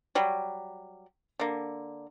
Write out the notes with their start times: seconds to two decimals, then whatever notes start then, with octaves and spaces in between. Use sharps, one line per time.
0.15 F#3 G3
1.39 D3 A#3